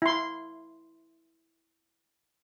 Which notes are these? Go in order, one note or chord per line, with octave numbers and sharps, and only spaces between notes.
E4 C6